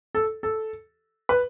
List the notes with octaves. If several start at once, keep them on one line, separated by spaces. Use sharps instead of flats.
A4
A4
B4